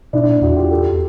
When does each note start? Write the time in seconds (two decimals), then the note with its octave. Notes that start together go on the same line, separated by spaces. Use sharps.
0.13 B2 D4 E4
0.28 A#2
0.42 E2 E4 F#4
0.56 F4 G4
0.71 G4 A4